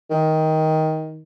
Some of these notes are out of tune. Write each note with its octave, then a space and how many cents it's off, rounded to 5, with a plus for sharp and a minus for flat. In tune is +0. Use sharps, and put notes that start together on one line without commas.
D#3 +15